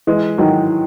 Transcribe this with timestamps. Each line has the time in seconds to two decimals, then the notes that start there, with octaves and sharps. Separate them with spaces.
0.07 E3 G#3
0.38 D#3 F#3